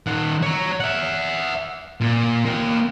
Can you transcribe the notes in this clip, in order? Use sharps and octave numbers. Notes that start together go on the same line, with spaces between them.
D#3 F#5
C#5 A#5
E5 F#5
A#2
A#3 G5